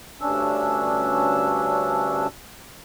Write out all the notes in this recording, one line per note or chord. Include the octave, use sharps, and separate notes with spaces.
D2 G2 C#4 D4 E6